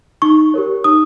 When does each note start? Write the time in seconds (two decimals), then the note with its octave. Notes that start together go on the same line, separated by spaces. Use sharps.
0.22 D#4 C#6
0.54 G4 A#4 C#5
0.84 D#4 D#6